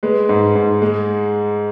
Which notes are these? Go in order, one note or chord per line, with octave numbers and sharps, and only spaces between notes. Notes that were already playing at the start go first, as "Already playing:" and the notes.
G#3 B4
G#2
G#2
G#3